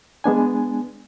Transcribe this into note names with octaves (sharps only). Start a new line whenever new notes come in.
G#3 B3 D4 G#5